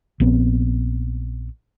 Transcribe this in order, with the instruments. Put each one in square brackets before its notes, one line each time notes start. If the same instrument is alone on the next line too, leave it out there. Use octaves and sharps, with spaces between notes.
[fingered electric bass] A#1 B3 C4